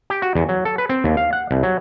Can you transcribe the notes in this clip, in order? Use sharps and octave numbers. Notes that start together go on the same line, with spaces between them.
G4
F#4
E2
F#3
A4
B4
C4
D#2
F5
F#5
C2
F#3